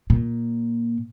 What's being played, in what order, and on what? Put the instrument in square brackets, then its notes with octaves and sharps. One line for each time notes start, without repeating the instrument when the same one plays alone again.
[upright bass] A#2